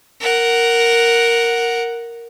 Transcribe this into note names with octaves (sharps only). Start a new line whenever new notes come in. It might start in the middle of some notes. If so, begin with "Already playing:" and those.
A#4 F#5